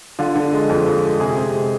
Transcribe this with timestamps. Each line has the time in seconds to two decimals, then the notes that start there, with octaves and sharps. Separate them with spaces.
0.19 D3 F4
0.36 D3
0.53 G#3
0.69 F2
0.86 F2
1.04 G#3
1.20 C3 G#4
1.37 C3
1.54 G#3